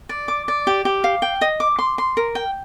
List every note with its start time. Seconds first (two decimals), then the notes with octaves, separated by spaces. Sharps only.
0.09 D5
0.28 D6
0.48 D5
0.67 G4
0.85 G4
1.04 F5
1.22 G5
1.41 D#5
1.60 D6
1.79 C6
1.98 C6
2.17 A#4
2.35 G5